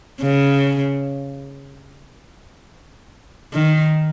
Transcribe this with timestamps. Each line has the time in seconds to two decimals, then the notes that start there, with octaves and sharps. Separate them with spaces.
0.22 C#3
3.53 D#3